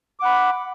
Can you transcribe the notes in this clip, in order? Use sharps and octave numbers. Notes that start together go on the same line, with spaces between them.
F#5 B5 D6